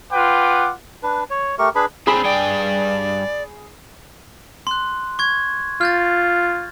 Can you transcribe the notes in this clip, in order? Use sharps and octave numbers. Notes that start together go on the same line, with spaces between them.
F4 B4 F#5 G5 D6
D4 B4
C#5
A3 G4 A#4 C#6
D4 G#4 B4 B5
C4 D4 G#4 B5
G2 D5 G5
C6 F#6
C#6 G#6
F4 F6 G6 A6